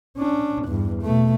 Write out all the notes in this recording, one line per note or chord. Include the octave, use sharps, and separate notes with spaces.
C#4 D4
E2 G2
B2 A3